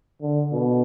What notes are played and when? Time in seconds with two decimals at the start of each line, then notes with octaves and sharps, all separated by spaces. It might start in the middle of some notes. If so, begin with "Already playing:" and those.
0.21 D3
0.52 B2